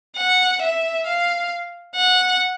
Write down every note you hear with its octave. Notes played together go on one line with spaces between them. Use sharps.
F#5
E5
F5
F#5